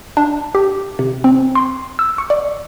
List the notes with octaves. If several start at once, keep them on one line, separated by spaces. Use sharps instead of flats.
D4
G4
C3
C4
C6
E6
C#6
D5